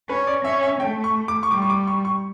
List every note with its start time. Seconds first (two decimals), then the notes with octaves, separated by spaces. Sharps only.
0.09 C#4 B4
0.27 D5
0.45 C#4 E5
0.63 E5
0.80 A3 G5
1.04 C#6
1.28 D6
1.43 C#6
1.51 G3 D6
1.62 C#6
1.70 D6
1.87 C#6
2.05 C#6